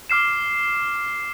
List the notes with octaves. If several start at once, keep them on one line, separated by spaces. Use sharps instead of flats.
D6 F6 C7 E7